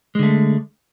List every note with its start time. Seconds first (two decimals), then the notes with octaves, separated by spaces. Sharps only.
0.15 G#3
0.19 D3
0.23 A3